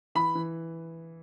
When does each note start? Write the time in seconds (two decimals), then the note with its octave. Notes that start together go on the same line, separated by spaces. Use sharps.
0.15 E3 B5
0.35 E3